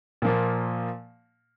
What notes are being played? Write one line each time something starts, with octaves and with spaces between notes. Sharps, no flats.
A#2 F3 A#3